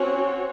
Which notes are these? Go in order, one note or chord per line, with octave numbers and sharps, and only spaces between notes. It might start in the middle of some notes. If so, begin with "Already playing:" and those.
Already playing: C4 C#4 F#4 C#5